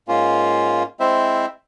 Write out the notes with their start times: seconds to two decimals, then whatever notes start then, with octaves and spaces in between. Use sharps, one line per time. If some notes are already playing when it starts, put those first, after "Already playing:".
0.08 G#2 A#3 C#4 F4
1.00 G#3 C4 E4 C5 E5